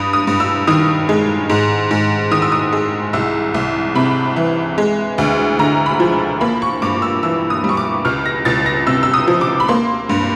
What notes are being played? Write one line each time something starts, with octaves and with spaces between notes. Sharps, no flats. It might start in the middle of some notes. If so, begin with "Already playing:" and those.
Already playing: G2 D#6
D#6
G2
E6
D#3 D#6
G#3
G#2
G#2
D#3 D#6
E6
D#6
G#3
C2 E6
C2
C3 B5
E3
G#3
D2
D3 A#5
B5
F3
A#3 B5
C#6
G2 D6
E6
E3 E6
D#6
G3
C#6
D6
C#2 F6
A#6
C#2 A6
A#6
C3 E6
E6
D#6
F3
D6
B5
A#3 C6
G2